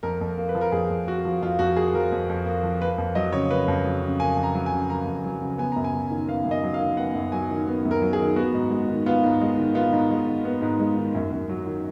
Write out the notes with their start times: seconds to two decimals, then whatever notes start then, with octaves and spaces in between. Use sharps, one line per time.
0.03 F2 A#4
0.21 F2
0.38 A#3
0.49 B4
0.55 F3
0.61 A#4
0.72 F2 G#4
0.90 F2
1.07 A#3 F#4
1.25 F3
1.42 F2 F4
1.59 F2 F#4
1.76 A#3 G#4
1.94 F3 A#4
2.12 F2
2.29 F2
2.46 A#3
2.63 F3
2.81 A#3 B4
2.98 F2
3.15 F#3 D#5
3.33 C#3 C#5
3.50 A#3 B4
3.68 F2
3.85 F#3
4.03 C#3
4.20 A#3 G#5
4.37 F2
4.43 A#5
4.55 F#3
4.66 G#5
4.72 C#3
4.89 A#3 A#5
5.06 F2
5.24 F#3
5.42 C#3
5.58 B3 G#5
5.72 F#2 A#5
5.84 G#5
5.94 F#3
6.10 D#3
6.28 B3 F5
6.45 F#2
6.51 D#5
6.64 F#3
6.74 F5
6.80 D#3
6.97 B3 F#5
7.15 F#2
7.32 F#3 G#5
7.50 D#3
7.67 B3
7.85 F#2
7.91 A#4
8.02 F#3
8.13 G#4
8.19 D#3
8.36 B3 F#4
8.54 G#2
8.71 G#3
8.88 D#3
9.06 B3 F4
9.24 G#2
9.41 G#3
9.58 D#3
9.75 B3 F4
9.93 G#2
10.11 G#3
10.28 D#3
10.45 B3
10.62 G#2
10.80 G#3
10.97 D#3
11.15 F#2
11.32 F#2
11.49 F#3
11.66 D#3